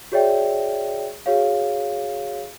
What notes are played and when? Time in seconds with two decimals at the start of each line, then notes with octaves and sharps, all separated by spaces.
0.12 F#4 G#4 C#5 D5 E5 G5
1.26 F#4 G#4 C#5 F5